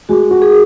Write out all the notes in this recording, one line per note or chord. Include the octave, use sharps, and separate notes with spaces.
G#3 F#4
F#4
G#4